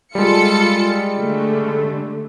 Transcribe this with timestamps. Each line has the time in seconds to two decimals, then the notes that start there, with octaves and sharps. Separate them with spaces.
0.15 G3 G#3 F4 A4 C#7
1.18 D3 A3